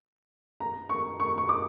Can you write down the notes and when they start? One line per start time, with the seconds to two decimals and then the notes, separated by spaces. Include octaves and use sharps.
0.60 A#5
0.89 C#6
1.20 C#6
1.38 C#6
1.49 D6